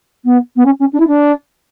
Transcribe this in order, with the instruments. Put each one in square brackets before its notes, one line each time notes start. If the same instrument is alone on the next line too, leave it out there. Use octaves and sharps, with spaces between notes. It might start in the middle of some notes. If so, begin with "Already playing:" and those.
[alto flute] B3
B3
C#4
C#4
D4
E4
D4